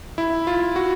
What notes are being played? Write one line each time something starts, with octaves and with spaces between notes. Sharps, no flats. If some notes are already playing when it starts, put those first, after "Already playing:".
E4
F4
F#4